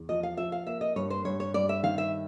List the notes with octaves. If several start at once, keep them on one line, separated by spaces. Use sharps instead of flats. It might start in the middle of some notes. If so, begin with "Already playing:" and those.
Already playing: E2
F3 D#5
F5
F3 E5
F5
A#3 E5
D#5
G2 C#5
C5
G2 C#5
C#5
G2 D5
E5
D#3 F5
E5